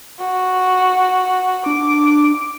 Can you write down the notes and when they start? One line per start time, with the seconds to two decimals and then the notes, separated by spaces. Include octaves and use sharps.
0.19 F#4
1.66 D4 D6